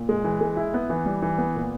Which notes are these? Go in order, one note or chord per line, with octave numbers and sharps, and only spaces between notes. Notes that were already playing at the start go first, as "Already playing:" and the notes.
Already playing: A#2
G#3
E3
G#3
E4
B3
E3
G3
E3
B3
A#2